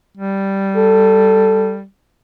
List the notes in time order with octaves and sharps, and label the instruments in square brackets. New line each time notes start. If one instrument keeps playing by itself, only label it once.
[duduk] G3
[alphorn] A4